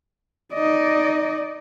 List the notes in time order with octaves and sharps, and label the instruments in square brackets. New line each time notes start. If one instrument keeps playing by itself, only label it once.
[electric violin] D#4 D#5 [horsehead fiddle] D5